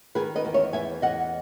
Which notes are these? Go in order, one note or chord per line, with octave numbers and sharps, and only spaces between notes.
D#3 G#4 B4
B4 D#5
E2
C#5 E5
E2 E5 G#5
E2 D#5 F#5